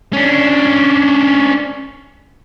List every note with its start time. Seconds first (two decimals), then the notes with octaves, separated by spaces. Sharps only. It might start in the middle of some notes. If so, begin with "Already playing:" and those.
0.13 C#4 D4